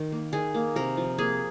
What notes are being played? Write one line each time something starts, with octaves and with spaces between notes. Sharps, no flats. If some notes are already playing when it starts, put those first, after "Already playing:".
Already playing: D#3
A#3
D#3 G#4
A#3
C3 A#4
F3
A#3 G#4